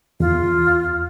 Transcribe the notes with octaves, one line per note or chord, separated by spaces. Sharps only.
E2 F4